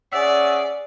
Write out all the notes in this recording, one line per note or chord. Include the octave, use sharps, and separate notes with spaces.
C#4 G#4 D5 E5 F#5